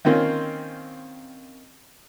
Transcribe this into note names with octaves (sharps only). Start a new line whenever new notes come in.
D#3 A#3 C4 C#4 F4